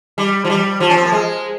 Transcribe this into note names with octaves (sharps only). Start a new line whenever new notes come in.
G3
F3
G3
F3
C#4
C4
A#3
G#3